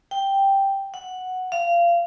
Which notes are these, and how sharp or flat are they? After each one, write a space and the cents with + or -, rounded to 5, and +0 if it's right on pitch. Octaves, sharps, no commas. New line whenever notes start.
G5 +0
F#5 +0
F5 -25